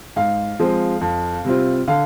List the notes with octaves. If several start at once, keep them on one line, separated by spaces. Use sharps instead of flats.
G#2 F5
F3 G#3 C4
F2
C3 G3 C4 F4
D3 F5